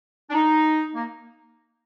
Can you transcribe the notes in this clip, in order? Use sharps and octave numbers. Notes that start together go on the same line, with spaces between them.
D4
D#4
A#3